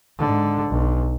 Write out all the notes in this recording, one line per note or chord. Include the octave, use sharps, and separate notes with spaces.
G#2 D3
B1